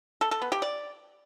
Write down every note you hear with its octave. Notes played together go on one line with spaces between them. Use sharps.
A4
A4
B3
G4
D5